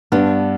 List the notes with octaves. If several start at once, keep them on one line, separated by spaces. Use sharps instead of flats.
G2 B3 D4